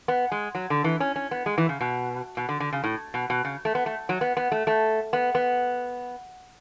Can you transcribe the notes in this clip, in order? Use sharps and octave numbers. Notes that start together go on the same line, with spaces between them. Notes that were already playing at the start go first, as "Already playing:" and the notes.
B3
G#3
F#3
D3
E3
C#4
C#4
B3
G#3
E3
C#3
B2
B2
D3
D3
C#3
A2
B2
B2
C#3
A3
B3
A3
F#3
B3
B3
A3
A3
B3
B3